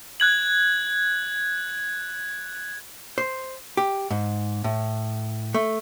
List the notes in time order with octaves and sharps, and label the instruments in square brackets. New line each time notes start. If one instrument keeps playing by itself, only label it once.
[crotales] F#6 G#6 F#7
[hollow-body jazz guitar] C5
G4
G#2
A2
A3